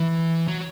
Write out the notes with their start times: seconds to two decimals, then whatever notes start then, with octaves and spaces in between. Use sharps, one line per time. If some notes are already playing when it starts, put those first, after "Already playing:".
Already playing: E3
0.48 F#3